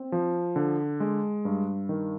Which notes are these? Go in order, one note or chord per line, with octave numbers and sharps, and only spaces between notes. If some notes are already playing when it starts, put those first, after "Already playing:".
Already playing: C4
F3
D3
G#3
G2
D#3